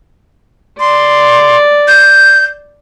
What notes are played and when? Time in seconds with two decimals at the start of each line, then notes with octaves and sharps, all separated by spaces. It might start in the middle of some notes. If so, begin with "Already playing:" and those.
0.80 D5 C6
1.88 G6